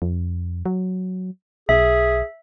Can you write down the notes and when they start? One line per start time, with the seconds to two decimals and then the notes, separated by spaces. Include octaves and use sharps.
0.02 F2
0.66 F#3
1.69 B1 G#4 E5